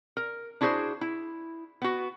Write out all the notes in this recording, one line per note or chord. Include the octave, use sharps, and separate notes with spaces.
A#4
D4 E4 F#4 G#4 C5
E4
B3 F#4